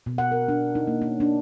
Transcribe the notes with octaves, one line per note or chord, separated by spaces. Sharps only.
B2
F#5
A#4
D4
D#4
A#3
C#4
D4